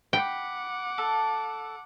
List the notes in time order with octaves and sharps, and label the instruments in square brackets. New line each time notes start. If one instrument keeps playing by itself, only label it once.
[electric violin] F#5 D6 [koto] G5 [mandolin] B5
[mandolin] A4